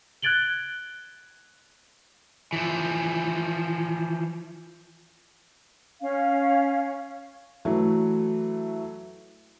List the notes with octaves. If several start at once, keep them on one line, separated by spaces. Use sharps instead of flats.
F#6 G#6 A6 D7 F#7 G7
E3 F3
C#4 F5
E3 F#3 A3